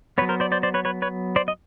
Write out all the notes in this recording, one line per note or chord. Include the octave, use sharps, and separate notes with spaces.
F#3 B3 B4 C#5
A#4 C5
C5 D5
C5 D5
C5 D5
B4 C#5
B4 C#5
B4 C#5
C5 D5
D#5